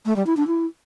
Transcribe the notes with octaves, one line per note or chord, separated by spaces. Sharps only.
A3
G3
E4
D4
E4